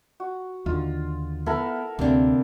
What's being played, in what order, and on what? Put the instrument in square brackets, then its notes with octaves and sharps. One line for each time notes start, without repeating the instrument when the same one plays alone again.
[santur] F#4
[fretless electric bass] D#2 D3 [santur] F4
[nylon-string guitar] B3 [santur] E4 A4 A#4
[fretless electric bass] D2 [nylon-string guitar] C3 A#3 D4